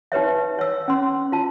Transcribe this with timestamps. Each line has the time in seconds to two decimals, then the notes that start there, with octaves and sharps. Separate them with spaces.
0.12 D#4 G4 B4 C#5 E5
0.59 C#5 E6
0.88 C#4 C6
1.32 F4 A5